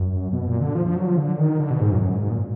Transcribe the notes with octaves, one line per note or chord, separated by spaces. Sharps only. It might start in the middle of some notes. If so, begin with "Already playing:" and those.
Already playing: F#2
B2
A#2
D3
F3
F3
F#3
F3
D3
D#3
D3
B2
G#2
F#2
F#2
G#2
A#2